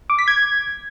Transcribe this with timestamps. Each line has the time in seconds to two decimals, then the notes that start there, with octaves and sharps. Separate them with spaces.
0.10 D6
0.19 B6
0.28 G#6